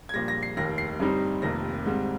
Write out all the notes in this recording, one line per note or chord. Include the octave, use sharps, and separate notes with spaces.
G#6
A#1 A#2 G3 A#6
A#6
C7
F1 D#2 D#3 A#6
C7
G1 G2 G3 C4 D#4
F1 F2 C3 D#3 A#3 A#6
G#1 G#2 G3 C4